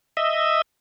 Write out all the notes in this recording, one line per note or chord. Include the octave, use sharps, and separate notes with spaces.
D#5 E5